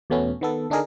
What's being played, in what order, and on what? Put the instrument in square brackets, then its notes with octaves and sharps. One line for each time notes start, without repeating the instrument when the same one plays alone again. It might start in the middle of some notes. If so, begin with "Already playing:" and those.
[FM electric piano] E2 B2 A3 B3 C#4
D#3 B3 A4
D3 D4 D#4 G#4 A#4